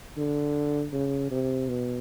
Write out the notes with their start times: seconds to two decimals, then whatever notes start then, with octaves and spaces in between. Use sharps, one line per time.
0.17 D3
0.93 C#3
1.31 C3
1.69 B2